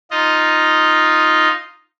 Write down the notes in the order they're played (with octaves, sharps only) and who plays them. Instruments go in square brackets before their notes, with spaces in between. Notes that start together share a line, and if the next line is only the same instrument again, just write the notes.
[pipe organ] D#4 F4 D#5